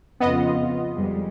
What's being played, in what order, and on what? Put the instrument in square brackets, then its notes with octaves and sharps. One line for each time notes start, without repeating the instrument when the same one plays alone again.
[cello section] F2 C#3 F4 [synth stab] B3 D#5
[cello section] F2 G3 G#3